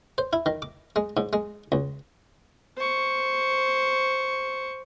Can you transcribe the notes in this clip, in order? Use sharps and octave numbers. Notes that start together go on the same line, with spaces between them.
C5
E4
D#3
D6
G#3
G#2
G#3
C#2
C5 C#6